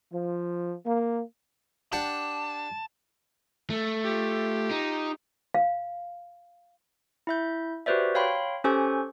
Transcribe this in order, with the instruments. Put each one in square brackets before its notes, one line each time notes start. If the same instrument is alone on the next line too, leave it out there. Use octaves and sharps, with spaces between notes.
[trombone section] F3
A#3
[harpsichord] D4 G4 F#5 [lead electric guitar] A5
[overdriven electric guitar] A3
[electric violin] F4 G4
[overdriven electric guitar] D#4
[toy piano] F5
[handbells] E4 E5 G6
F#4 G4 B4 C5 D5 E5
C#5 F5 G5 B5 C6
C#4 G4 A4 C5 G#5 C#6